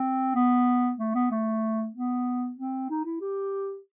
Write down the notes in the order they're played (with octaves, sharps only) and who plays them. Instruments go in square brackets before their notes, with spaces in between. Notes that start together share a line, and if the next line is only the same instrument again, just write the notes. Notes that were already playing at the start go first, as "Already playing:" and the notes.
Already playing: [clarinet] C4
B3
A3
B3
A3
B3
C4
D#4
E4
G4